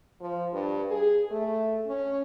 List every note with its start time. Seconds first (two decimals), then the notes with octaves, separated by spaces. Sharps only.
0.21 F3
0.53 G2
0.90 G#4
1.31 A3
1.87 C#4